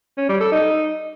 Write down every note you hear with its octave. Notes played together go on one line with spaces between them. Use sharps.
C#4
G3
A4
D#4